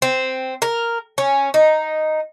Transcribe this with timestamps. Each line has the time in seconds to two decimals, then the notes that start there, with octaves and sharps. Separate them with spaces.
0.02 C4
0.62 A#4
1.18 C#4
1.54 D#4